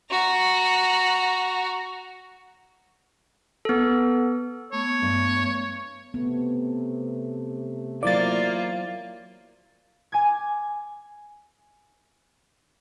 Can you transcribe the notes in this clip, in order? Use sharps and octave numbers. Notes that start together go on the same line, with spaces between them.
F#4 A#5
B3 A4
A3 B3 C#5
G2
C3 A3 B3
F#3 A#3 E4 F4 C5 D5 A6
G#5 D6 G#6